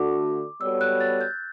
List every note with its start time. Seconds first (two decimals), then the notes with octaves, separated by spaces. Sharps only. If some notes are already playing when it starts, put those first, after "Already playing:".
Already playing: D3 A3 D4 F#4 A4 D6
0.61 G3 B3 F#4 A4 C#5 E6
0.81 F#6
1.00 A6
1.21 G6